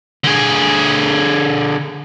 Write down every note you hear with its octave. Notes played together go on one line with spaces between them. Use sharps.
D3 G#4